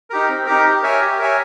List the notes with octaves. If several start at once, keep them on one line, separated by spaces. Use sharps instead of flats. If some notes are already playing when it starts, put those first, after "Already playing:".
D#4 G4 A#4
C4
D#4 G4 A#4
G4
A#4 C#5 E5 G#5
G4
A#4 C#5 E5 G#5